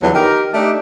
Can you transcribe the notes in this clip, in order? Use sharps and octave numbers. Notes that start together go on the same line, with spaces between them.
E2 D3 F3 F#3 B3
D#3 G4 A#4
A3 D4 D#4 G4 E5